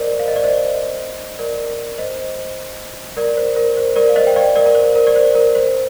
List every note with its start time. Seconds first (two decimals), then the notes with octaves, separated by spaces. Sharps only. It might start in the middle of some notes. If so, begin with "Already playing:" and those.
Already playing: A#4 C5 D5 D#5
0.19 F5
0.28 D#5
0.36 D5
0.44 C5 D#5
1.39 A#4 D5
1.98 C5 D#5
3.17 A#4 D5
3.37 C5
3.56 A#4
3.77 C5
3.96 A#4 D5
4.09 F5
4.16 C5 D#5
4.27 G5
4.36 D5 F5
4.56 A#4 D5
4.66 A#4
4.75 C5
4.96 A#4
5.07 D5
5.16 C5
5.35 A#4
5.55 C5